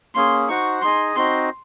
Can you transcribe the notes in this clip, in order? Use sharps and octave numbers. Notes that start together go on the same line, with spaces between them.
A#3 C#4 G#4 C6
D#4 F#4 C5 F#5 C#6
D#4 G#4 D#5 G#5 C6
C4 D#4 F#4 C5 D#5 C6